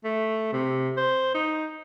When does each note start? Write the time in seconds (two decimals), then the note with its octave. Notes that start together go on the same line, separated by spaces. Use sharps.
0.04 A3
0.52 C3
0.97 C5
1.34 D#4